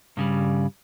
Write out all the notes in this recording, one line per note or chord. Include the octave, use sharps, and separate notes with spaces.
G2 C#3 G3